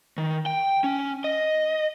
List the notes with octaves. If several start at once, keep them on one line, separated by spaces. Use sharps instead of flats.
D#3
G5
C#4
D#5